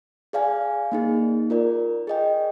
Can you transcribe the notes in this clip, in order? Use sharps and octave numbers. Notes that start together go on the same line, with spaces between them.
G#4 D5 F5 G#5
A#3 D#4 G#4
F4 A#4 D5
G#4 D#5 G5